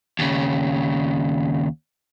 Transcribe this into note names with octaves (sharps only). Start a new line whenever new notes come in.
D#2 C#3